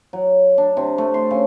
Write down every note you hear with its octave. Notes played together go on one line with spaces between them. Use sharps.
F#3
D4
C3
A3
C6
C#3